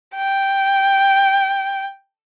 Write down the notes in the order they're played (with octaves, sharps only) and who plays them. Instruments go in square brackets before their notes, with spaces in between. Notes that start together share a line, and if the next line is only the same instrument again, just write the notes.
[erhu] G5